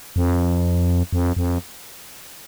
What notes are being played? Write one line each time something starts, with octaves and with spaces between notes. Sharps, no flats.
F2
F2
F2